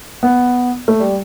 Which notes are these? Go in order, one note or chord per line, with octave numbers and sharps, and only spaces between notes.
B3
A3
G3